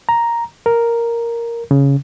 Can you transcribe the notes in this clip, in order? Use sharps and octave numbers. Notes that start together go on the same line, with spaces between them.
A#5
A#4
C#3